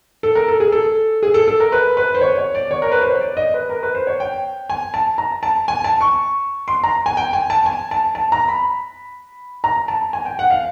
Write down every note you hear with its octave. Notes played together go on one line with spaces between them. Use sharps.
A4
A#4
A4
G#4
A4
G#4
A4
A4
A#4
B4
B4
C5
C#5
C#5
D5
C#5
A#4
B4
C5
C#5
D5
D#5
B4
A#4
B4
C5
C#5
G5
G#5
A5
A#5
A5
G#5
A5
C#6
C6
A#5
G#5
G5
G#5
A5
G#5
A5
A5
A#5
B5
A#5
A5
G#5
G5
F#5
F5